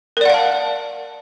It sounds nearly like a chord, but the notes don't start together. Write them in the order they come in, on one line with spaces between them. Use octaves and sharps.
A#4 D5 F#5 F5 A5